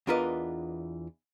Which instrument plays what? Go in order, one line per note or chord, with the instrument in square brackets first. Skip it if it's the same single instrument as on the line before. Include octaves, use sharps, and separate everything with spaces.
[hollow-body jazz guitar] E2 D4 F4 A#4 B4 D#5